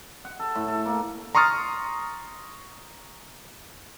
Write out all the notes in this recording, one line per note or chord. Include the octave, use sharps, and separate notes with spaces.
F#5
A4
A2
A4
A#3
A#5 C6 C#6 D#6 F6 A6